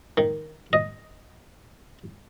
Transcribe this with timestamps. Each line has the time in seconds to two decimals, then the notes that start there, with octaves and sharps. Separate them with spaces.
0.17 D#3
0.73 D#5